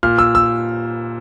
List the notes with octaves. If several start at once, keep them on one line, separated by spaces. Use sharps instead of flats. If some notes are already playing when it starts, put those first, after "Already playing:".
A#2 F6
E6
E6